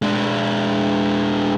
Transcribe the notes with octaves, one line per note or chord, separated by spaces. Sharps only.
G#3 D4